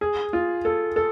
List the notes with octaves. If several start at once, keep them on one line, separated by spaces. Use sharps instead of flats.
G#4
F4
A4
A4